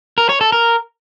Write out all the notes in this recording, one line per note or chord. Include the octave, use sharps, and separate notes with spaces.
A#4
C#5
A4
A#4